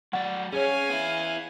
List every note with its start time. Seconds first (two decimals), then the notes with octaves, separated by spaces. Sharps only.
0.13 F#3 D5 F#5
0.53 C#4 G#4 C#5 F5 G#5
0.90 B3 E4